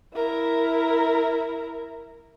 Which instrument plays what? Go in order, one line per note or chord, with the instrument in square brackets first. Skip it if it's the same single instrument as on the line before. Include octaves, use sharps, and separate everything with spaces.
[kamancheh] E4 A#4